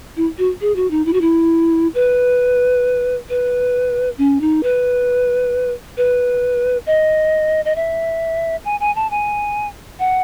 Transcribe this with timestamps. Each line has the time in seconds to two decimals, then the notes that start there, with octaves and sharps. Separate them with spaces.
0.17 E4
0.38 F#4
0.61 G#4
0.76 F#4
0.91 D#4
1.06 E4
1.13 F#4
1.21 E4
1.95 B4
3.29 B4
4.18 C#4
4.41 D#4
4.63 B4
5.97 B4
6.87 D#5
7.65 D#5
7.76 E5
8.65 G#5
8.80 G#5
8.96 A5
9.11 G#5
9.99 F#5